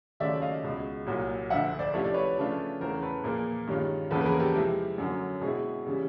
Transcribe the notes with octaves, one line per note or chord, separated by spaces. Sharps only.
D#2 C#3 F#3 A3 D5 E5
D#5 F5
C#2 B2 G#3
C2 A#2 F#3
D2 D3 F3 E5 F#5
C5 D5
C3 F3 A3 C#4 E4 C#5
D5
B4 C#5
C#3 F3 A3 D4 F4
E2 C#3 E3 A3 A#4 C5
A4 B4
A#2 F3 A#3 G#4 A#4
G2 D#3 G#3 C#4 F4
E2 C#3 F3 A#3 A4 B4
B4
G#4 A#4
G4 A4
C3 F3 G#3 C4 E4
F#2 D3 F#3
B2 G#3 C4 E4 G#4
C#3 E3 G3